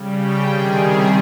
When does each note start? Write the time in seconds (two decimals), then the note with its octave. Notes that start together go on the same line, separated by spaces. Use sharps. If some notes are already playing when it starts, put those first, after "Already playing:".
Already playing: C#3 G3
0.19 G5
0.49 C3 D#3 G3 G#4
0.79 G#4